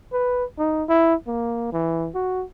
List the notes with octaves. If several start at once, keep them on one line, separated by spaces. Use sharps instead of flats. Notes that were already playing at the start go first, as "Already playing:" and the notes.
B4
D#4
E4
A#3
E3
F#4